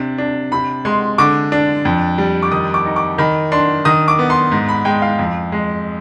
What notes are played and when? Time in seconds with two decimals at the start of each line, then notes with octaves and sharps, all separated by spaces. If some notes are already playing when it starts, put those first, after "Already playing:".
Already playing: C3 D4
0.18 D4
0.52 C3 B5
0.85 G#3 C6
1.18 D3 D6
1.52 D4
1.85 F2
2.18 G3
2.43 D6
2.51 D#3 D#6
2.74 D6
2.86 D#4
2.96 D6
3.18 D#3 B5
3.52 D4 C6
3.85 D#3 D#6
4.08 D6
4.19 B3
4.30 C6
4.52 G#2
4.69 B5
4.85 G#3 G5
5.02 F5
5.19 F2
5.52 G#3